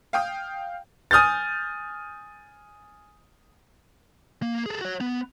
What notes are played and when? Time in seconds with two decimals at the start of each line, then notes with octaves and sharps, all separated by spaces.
0.13 F5 G5 D#6
1.11 G#5 D#6 F6 G6 A6
4.42 A#3
4.66 G#4 A4
4.81 F#4 C#5
5.01 B3